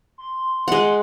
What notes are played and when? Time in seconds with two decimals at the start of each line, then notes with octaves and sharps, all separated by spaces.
0.18 C6
0.68 G#3 F#5